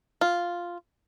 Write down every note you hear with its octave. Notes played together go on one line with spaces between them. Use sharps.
F4